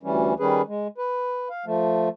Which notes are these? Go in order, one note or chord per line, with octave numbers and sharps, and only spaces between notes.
D2 E3 G3 C#4
D#3 G3 C#4 G#4 B4
G#3
B4
F5
F3 A3